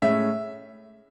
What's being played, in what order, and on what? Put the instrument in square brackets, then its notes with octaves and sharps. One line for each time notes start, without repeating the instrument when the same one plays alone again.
[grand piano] A2 G#3 C#4 E5